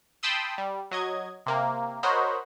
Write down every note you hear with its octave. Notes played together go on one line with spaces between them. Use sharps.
G5 A5 B5 C6 D#6 E6
G3
F#3 D#5 G#6
C3 A#3
F#4 A#4 C5 C#5 D#5 B5